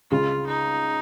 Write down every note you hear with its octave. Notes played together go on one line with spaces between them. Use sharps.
C#2 C#3 G#3 F4
D#4